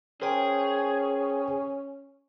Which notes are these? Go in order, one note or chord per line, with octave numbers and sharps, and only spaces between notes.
C#4 G#4 A#4 C5 G5